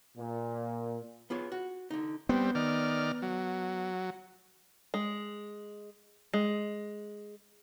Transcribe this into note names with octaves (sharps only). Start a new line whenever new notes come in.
A#2
B3 F4 G#4 C#5
F#4
D3 D#4
G3 B3 C4
D#3 D5 F6
F#3
G#3
G#3